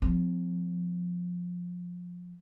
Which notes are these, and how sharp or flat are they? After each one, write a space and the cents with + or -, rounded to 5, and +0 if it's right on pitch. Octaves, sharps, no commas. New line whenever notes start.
F3 +20 C4 -30